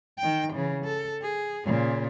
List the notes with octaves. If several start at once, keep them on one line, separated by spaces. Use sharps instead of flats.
D#3 G5
C#3 E3
A4
G#4
A#2 C#3